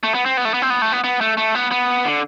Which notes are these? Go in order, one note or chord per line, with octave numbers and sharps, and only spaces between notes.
A3
B3
C4
B3
A3
B3
C4
B3
A3
B3
B3
A3
A3
B3
B3
D3